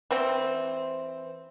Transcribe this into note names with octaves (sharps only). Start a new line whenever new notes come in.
E3 C4